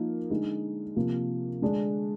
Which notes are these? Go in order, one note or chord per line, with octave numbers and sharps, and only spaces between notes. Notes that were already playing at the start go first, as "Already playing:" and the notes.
Already playing: F3 A#3 D#4
D3 G#3 D#4
C3 F3 A#3
D3 G#3 D4